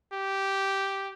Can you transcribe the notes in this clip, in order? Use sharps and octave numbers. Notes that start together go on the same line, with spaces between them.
G4